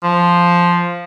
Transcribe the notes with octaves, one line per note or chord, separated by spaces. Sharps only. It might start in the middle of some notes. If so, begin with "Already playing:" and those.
F3